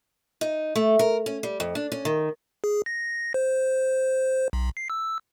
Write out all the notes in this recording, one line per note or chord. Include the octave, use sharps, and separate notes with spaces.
D#4
A3
A#4
C#4
G3
F2
D4
C#4
D#3
G#4
A#6
C5
B1
C7
E6